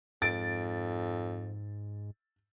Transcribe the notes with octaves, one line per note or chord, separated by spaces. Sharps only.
F2 G#2 A6 D7